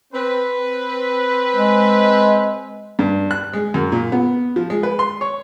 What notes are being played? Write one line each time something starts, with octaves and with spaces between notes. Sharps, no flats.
C4 B4
G#3
G2
F#6
G#3
F#2
A#2
B3
F3
G#3
B4
C6
C#5